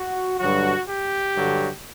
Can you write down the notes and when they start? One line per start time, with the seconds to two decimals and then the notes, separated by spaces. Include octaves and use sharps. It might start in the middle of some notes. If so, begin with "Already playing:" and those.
Already playing: F#4
0.39 G2 D3 F#3 F#4
0.88 G4
1.34 G2 D3 F#3